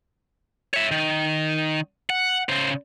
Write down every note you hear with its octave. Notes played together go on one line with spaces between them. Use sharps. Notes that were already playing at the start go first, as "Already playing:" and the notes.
C#5 E5
D#3
F#5
C#3 C5